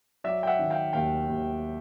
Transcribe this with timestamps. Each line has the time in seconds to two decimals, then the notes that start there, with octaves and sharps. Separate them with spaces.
0.24 F#3 D5 E5
0.43 G5
0.47 E5 F#5
0.59 D#3
0.70 F5 G5
0.93 D#2 F5 G5
1.28 D#2